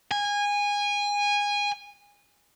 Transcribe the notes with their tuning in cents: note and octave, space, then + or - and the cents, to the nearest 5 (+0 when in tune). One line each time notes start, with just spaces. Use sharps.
G#5 -20